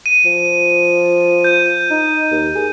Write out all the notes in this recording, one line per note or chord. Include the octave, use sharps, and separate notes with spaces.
D#7
F3
G6 D#7
D#4
D#2
G#4